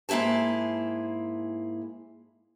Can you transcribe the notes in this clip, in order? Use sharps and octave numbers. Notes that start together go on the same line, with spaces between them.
G#2 A#3 E4 G#4 A5